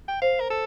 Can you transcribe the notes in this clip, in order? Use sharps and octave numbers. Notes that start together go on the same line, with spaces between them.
G5
C5 F5
A#4
A4